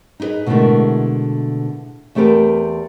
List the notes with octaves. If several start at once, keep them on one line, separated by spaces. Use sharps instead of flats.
D#4 E4 G#4 B4 D#5
B2 D3 G#3 A3 E4 A#4
E2 A3 C4 G4 A#4 B4